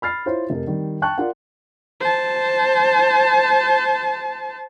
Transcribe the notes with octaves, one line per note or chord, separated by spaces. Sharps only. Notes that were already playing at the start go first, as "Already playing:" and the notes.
B5 F6 A6 C7
E4 F4 C5 C#5
F1 A#4
D#3 G3
G5 A5 C#6 F#6
F4 A#4 D5 F#5
C5 A5